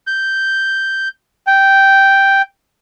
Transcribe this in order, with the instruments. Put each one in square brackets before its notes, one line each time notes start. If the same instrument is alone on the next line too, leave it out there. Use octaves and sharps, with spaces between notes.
[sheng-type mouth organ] G6
G5